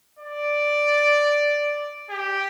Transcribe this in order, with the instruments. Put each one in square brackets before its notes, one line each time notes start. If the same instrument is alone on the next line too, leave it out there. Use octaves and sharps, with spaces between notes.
[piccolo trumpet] D5
G4